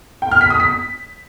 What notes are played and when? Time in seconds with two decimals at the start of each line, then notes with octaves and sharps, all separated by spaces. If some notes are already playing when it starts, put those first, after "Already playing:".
0.22 G5
0.31 F6
0.41 B6
0.50 D#6
0.60 B6